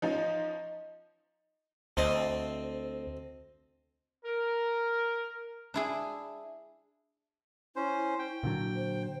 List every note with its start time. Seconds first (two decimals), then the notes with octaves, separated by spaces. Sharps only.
0.02 F3 C#4 D#4 D#5
1.97 D2 C4 D#5 A5
4.25 A#4
5.74 D4 E4 G#4
7.76 C#4 E4 C5
8.19 G5
8.43 A#2 D3 F#3
8.76 C5